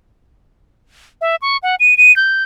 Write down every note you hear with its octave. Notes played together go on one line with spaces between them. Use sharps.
E5
C#6
F#5
D#7
D#7
G6